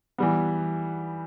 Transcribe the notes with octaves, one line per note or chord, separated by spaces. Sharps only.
E3 G3 B3